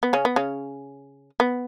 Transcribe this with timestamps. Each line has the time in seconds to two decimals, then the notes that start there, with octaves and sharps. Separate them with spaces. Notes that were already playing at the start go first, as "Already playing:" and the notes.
0.03 B3
0.13 C#3 C#4
0.25 B3
0.36 C#3 C#4
1.40 B3